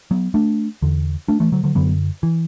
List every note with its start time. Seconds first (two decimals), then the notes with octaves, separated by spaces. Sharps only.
0.11 F#3 B3
0.34 A3 D4
0.82 E2 D3
1.28 A3 D4
1.40 E3 A3
1.52 D3 F#3
1.64 D3 F#3
1.75 F#2 D3 F#3 B3
2.23 E3